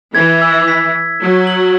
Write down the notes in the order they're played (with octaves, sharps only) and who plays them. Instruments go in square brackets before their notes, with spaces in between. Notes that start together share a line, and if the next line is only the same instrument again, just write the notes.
[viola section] E3 [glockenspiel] G#6
[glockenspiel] E6
B6
E6
[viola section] F#3 [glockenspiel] B6
[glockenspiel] F#7